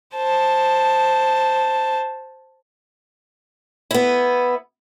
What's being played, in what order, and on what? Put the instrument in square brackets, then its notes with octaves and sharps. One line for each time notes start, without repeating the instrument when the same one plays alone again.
[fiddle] C5 A5
[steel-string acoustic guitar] B3 E4